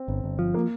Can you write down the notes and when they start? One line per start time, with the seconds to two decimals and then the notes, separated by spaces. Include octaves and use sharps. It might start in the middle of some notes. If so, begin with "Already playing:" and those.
Already playing: C4
0.08 G1
0.24 G1
0.39 F3
0.54 A#3